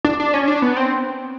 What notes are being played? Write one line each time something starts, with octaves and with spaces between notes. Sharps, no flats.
D4
D4
C#4
D4
B3
C4